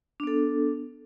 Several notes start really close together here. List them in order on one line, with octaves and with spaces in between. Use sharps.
D4 B3 A4